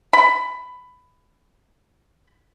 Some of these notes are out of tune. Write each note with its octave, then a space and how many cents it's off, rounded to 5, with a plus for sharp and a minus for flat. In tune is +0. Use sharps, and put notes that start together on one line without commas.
B5 +15